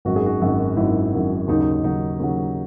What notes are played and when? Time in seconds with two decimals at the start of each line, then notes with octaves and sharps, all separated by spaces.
0.05 G#1 F#2 D#3 F#4
0.16 G#4
0.26 F#4
0.42 G#1 F#2 D#3
0.76 G#1 F#2 D#3 E4
1.13 G#1 F#2 D#3
1.48 D#2 C#3 F#3 D#4
1.60 D#4
1.72 D#4
1.84 D#2 C#3 F#3 D#4
2.20 D#2 C#3 F#3